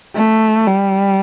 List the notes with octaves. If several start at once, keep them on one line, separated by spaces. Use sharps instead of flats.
A3
G3